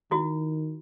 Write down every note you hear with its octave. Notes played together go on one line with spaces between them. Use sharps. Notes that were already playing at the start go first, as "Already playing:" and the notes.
D#3 E4 F#4